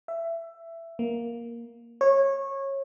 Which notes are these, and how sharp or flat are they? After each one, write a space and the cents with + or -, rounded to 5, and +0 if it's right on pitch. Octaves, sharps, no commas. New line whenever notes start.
E5 +15
A#3 +10
C#5 -20